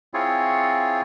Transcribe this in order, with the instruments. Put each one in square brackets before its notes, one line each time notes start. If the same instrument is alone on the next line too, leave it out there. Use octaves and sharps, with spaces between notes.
[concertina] C4 E4 F4 G#4 C#5